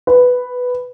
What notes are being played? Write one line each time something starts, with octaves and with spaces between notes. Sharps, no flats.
B4